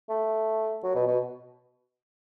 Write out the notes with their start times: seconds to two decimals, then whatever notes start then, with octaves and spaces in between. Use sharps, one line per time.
0.09 A3
0.83 F#3
0.95 B2
1.07 B2